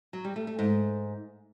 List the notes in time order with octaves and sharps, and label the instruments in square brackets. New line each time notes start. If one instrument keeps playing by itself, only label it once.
[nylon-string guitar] F#3
G3
A3
A3
G#2